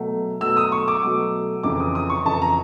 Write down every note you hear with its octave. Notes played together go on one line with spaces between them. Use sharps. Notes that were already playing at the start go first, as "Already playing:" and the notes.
Already playing: B2 F#3 A3
B2 F#3 A3 E6
D#6
C#6
D6
B2 F#3 A3
F2 C#3 E3 D6
D#6
D#6
C#6
F2 C#3 E3 A5
A#5